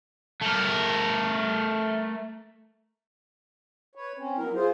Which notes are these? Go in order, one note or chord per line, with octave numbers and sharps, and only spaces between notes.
A3 A#4
B4 C#5
C4 C#4
F#3 B3 E4 A#4
F4 G#4 C5